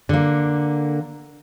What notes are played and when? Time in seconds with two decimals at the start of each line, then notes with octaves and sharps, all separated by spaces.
0.09 D3 A#3